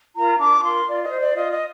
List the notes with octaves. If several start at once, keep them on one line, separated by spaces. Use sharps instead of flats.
F4 A#4 A#5
D4 D6
F4 A#4 C6
F4 D5
D#5
C5
D5
F4 D#5
D#5